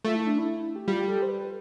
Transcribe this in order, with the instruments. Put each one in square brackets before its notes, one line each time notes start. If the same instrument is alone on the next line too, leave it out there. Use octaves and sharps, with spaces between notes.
[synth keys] A3 [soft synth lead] F4
[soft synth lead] E4
D4
E4
G4
[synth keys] G3 [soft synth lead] F4
[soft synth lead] A4
C5
B4